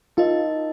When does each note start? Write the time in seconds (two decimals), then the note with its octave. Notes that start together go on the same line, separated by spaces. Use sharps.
0.17 D#4 F4 A#4 D#5